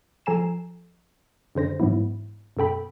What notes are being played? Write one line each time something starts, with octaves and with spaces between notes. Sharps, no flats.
F3 A4 G#5 A#5 C7 E7
F#2 D3 C5 A#6
G#2 E3 F#3 B3 E4
F#2 B2 A4 G5 B5